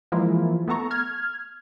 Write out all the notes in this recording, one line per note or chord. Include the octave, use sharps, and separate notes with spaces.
E3 F3 G#3 A#3 E4 F4
A3 B3 A4 A#5 C#6
F6 G#6